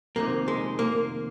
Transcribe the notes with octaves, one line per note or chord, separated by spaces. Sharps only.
F2 C3 D#3 A#3
G#3
A#3